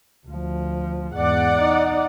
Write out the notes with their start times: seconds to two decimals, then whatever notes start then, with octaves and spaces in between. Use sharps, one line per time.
0.28 D2 F3
1.14 E2 G#2 D5 F#5
1.59 D#4